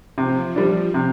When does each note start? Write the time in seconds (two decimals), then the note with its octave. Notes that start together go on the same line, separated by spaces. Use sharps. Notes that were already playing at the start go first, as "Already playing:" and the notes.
0.18 C3 F3
0.56 G3 D4
0.94 C3